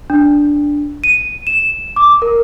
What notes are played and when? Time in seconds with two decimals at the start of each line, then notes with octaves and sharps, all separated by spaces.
0.10 D4
1.04 D#7
1.47 E7
1.96 D6
2.22 A#4